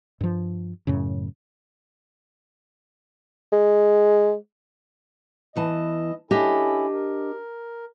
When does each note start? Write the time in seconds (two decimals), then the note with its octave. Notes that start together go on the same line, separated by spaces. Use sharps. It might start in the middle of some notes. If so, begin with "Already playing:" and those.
0.21 G2 F3
0.87 F#2 A2 C#3
3.52 G#3
5.56 E2 E3 D#5 A5
6.31 C#4 D4 E4 G4 A4 D#5
6.93 A#4